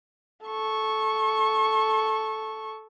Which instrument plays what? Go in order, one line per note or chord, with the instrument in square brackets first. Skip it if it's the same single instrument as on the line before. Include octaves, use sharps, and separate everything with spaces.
[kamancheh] A4 C#6